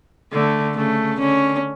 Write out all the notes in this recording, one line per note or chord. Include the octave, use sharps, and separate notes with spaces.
D3 A3
C#3 A3
D3 C#4